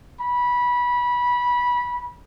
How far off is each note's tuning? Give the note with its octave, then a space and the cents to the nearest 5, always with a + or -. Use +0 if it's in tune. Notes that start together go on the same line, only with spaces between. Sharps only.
B5 -20